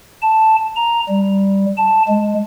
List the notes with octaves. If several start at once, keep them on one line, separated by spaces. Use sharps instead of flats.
A5
A#5
G3
A5
G#3